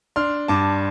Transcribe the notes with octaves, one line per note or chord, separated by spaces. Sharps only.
D4 C6 F6
G2 A5 D6